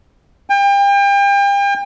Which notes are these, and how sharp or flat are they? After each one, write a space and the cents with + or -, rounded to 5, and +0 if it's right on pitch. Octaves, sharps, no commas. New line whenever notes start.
G5 +35